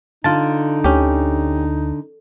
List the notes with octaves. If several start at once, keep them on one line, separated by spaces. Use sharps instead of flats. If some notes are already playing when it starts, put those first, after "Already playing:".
D3 D#4 F4 A5
D2 C#4 G4